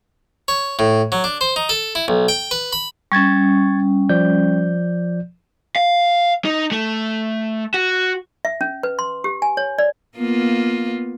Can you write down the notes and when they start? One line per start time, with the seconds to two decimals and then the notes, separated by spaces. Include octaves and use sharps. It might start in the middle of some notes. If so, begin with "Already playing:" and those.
0.48 C#5
0.79 A2
1.12 F#3
1.24 D4
1.41 C5
1.56 D#4
1.69 A4
1.95 E4
2.08 B1
2.28 G5
2.51 B4
2.73 B5
3.12 G3 C#4 C#6 G#6 A6
4.09 F3 D5 G6
5.76 F5
6.45 D#4
6.72 A3
7.74 F#4
8.45 E5
8.61 C#4
8.83 B4
8.99 C6
9.24 G4
9.42 G#5
9.57 C#5
9.78 D5
10.18 A#3 B3 F4